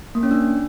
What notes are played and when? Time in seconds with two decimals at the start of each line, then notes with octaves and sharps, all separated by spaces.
0.15 A#3
0.23 C#4
0.31 D4